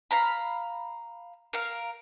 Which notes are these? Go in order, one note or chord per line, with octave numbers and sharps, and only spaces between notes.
F5 A#5 B5
A#4 F5